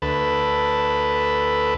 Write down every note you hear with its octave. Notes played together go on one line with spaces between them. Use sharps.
D2 A4 B4